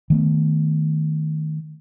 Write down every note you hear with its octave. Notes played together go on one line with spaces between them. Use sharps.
D#3 A3 B3